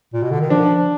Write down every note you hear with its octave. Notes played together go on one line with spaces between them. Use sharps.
A#2
B2
D3
D#3
F3 D4